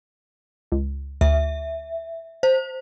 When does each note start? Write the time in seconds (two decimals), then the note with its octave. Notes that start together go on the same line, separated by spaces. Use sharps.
0.72 C#2
1.21 D2 E5
2.43 C5